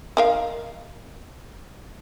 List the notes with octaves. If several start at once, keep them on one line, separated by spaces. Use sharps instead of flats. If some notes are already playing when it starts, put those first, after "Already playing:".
D#4 A#4 F5